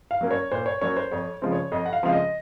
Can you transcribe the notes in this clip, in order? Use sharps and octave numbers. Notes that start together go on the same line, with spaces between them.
F5
F#3 A#3 C#4
C#5
A#2 C5
C#5
F#3 A#3 C#4 C#5
C5
F2 C#5
C#3 F3 G#3 C4
C#5
F2 D#5
F#5
F5
C#3 F3 G#3 C4 F5
D#5